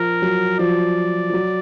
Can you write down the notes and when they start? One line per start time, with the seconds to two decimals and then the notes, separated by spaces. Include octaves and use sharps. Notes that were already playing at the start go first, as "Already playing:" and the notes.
Already playing: F3 A#4
0.22 F#3
0.59 F3 D5
1.29 F3
1.33 F#3